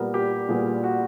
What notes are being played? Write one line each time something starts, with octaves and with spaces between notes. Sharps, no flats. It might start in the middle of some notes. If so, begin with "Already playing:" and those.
Already playing: A#2 G3 B3 A#4
G4
A#2 G3 B3 G#4
F#4